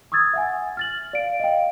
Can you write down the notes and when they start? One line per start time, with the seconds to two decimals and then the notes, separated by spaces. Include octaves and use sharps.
0.12 C#6 D#6 E6 G#6 A6
0.34 E5 F#5 G#5
0.77 F6 A6 F#7
1.13 D5 F5 D7
1.40 D#5 F5 G5